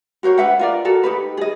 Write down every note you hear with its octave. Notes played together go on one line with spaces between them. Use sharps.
F#4 A#4 C5 C#5
D4 B4 E5 F#5
F4 A#4 D5
F#4 A4 A#4
D#4 G4 B4
G#4 D#5